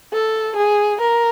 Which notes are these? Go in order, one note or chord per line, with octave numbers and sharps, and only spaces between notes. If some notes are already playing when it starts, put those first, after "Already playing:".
A4
G#4
A#4